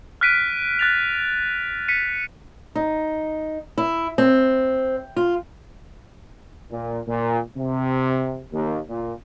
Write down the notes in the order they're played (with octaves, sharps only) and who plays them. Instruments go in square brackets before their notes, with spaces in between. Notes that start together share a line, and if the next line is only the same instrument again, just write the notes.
[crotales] F6 F#6 B6 D7 D#7
F#6 A6 F7
B6 C#7 D#7
[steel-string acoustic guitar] D#4
E4
C4
F4
[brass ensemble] A#2
A#2
C3
D#2
A#2